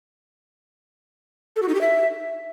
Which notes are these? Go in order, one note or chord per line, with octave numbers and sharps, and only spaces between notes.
A4
F#4
D#4
G4
E5